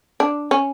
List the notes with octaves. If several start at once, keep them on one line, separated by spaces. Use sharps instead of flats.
D4
C#4